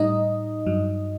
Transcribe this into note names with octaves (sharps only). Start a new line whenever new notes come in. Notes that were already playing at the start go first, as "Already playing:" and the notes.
Already playing: A2 G3 D#4 D#5
G2 F#3